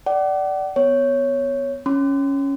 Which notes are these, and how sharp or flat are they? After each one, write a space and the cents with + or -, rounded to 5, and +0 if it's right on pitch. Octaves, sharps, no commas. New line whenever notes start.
D5 +0 F#5 +40
B3 +10 C#5 +0
C#4 +0 C6 -35